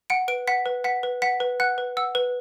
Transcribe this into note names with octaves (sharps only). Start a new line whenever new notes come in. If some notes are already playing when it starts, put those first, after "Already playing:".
F#5 D7
B4 D7
F#5 B6
B4
F#5 B6
B4
F#5 B6
B4
F#5 F#6
B4
F#5 E6
B4